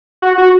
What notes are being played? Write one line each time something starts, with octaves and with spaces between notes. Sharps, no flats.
F#4
F#4